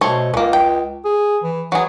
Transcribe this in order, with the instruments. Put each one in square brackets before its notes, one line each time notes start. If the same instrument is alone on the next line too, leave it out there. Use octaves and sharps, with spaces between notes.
[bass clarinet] B2 [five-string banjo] A3 C5 C#5
[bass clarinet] C#2 [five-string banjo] A3 A#3
[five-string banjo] G5
[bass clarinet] G#4
E3
[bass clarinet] E3 [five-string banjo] F#3 G#4